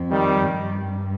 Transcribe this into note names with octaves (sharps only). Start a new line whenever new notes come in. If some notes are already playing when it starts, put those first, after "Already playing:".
Already playing: F2
D#3 G3
G2